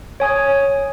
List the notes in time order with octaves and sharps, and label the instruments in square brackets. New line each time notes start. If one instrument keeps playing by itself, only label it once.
[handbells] C#5 G#5 D#6